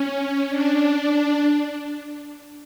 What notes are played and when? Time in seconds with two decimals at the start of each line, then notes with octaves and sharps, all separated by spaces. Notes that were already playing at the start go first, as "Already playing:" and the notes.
Already playing: C#4
0.49 D4